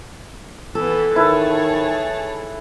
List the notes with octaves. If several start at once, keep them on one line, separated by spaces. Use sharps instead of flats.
E3 B3 A4
D#3 E4 G#4 B4 C#5 A5